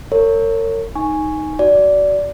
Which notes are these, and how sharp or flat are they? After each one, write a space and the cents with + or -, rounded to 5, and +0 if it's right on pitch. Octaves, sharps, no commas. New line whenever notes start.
A#4 -40 C#5 +0
D#4 +0 G#5 +0 C#6 +0
F#4 +15 D5 -15